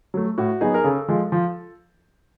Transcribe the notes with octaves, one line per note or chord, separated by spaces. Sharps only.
F#3 A3
A2 F#4
F#3 B3 D#4 G#4
A#4
C#3 A4
F3 G#3
F3